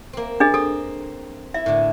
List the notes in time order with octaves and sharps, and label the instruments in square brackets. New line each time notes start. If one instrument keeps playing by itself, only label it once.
[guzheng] A#3 C4
[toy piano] D4 G#4 D#5
[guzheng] C4 [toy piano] A4
[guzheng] E4 [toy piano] E5
[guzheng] A2 D3